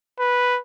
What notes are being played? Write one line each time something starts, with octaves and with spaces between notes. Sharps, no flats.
B4